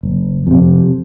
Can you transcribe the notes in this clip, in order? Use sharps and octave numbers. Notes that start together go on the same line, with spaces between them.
F#1
F2 C3